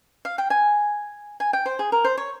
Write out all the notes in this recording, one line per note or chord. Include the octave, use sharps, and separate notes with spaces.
F5
G5
G#5
G#5
G5
C5
G#4
A#4
C5
C#5